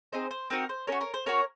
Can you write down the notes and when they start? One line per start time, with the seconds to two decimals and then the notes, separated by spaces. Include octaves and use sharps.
0.12 C4 D#4 G#4 C5
0.31 C5
0.50 C4 D#4 F#4 A#4
0.69 C5
0.87 C#4 F#4 A#4 C#5
1.01 A#4 C#5
1.14 C5
1.26 C#4 F#4 A#4 C#5